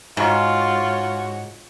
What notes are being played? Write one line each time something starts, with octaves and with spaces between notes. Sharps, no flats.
G#2 F4 F#4 C#5